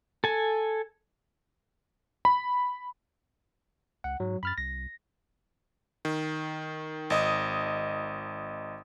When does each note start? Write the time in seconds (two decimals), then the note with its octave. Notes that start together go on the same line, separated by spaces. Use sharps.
0.24 A4 G#5
2.25 B5
4.04 C#2 F#5
4.20 G#2 F#3
4.43 F#2 B5 F6 A6
4.58 C2 A#6
6.05 D#3
7.10 G#1 D#5 D#6